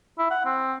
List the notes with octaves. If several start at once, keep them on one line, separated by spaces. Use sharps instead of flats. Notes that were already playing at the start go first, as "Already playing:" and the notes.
E4
F#5
C4